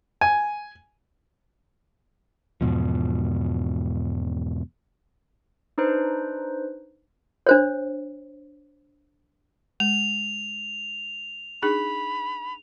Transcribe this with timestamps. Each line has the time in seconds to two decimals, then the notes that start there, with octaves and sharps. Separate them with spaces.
0.21 G#5
2.61 E2 G#2 B2 F3
5.78 D4 D#4 B4 C5
7.47 D4 C5 C#5
9.80 G#3 F7
11.62 D4 D#4 G#4 B5